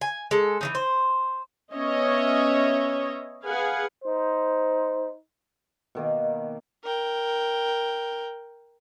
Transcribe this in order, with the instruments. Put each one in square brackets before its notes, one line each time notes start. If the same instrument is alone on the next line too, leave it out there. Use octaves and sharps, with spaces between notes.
[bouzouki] G#5
G#3 A4
E3 F#3 D#4
C5
[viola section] B3 C#4 C#5 D#5 E5
G#4 B4 F5 F#5 G#5
[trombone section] D#4 C5
[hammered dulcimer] B2 D#3 A#3
[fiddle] A#4 G5